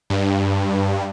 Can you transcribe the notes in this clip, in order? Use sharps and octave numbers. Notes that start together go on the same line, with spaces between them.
G2